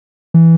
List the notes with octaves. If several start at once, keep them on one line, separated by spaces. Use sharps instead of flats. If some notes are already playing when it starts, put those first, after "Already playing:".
E3